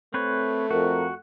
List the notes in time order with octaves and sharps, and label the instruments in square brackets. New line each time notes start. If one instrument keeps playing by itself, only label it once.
[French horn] A3 [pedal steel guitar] C4 B4 C#5
[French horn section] F2 A#4 [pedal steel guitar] F#4